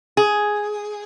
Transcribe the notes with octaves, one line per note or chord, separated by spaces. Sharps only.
G#4